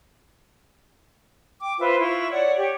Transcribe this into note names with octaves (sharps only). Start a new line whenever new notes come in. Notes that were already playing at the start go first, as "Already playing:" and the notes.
G5 D6
F4 B4 C5 E5
E4 F4 C#6
C#5 D5 F#5
G4 C#5